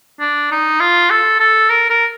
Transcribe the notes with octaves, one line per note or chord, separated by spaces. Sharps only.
D4
D#4
F4
A4
A4
A#4
A#4